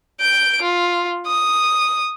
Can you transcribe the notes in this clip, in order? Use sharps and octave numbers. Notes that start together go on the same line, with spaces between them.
G6 D7
F4
D#6